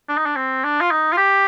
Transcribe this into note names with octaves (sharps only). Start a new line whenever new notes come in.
D4
D#4
D4
C4
D4
F4
D#4
F4
G4